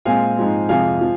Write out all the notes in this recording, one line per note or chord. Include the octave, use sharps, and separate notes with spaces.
A#2 G#3 C4 F5 G#5
G#2 F3 G#3 C4
F2 C3 F3 G#3 F5 G#5
F3